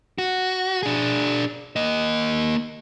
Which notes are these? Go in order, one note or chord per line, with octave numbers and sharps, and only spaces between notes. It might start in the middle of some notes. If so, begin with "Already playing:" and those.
F#4
D4 G#4
A#3 D#5